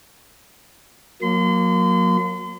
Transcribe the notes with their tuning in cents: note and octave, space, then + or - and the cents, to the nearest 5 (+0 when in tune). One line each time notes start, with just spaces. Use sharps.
F#3 -35 A#3 +0 C6 -40